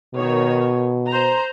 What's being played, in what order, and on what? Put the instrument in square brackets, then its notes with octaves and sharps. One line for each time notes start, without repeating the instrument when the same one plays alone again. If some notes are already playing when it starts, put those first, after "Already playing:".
[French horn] B2 [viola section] D#3 C#5
[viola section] C5 A#5